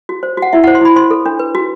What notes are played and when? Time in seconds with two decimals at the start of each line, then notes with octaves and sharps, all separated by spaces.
0.09 F#4
0.23 C5
0.37 F#4
0.42 F#5
0.53 E4 E5
0.64 F#5
0.67 C5
0.75 C6
0.81 E4 B5
0.96 C5 C6
1.11 A4
1.26 D4
1.39 B4
1.55 F#4